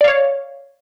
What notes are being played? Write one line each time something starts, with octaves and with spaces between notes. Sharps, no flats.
C#5 D5 F5